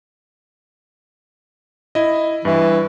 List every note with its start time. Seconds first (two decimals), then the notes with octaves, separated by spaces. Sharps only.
1.95 E4 D#5
2.45 G2 E3